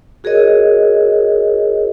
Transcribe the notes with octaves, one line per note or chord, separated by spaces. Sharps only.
F#4 G#4 A#4 C#5 D#5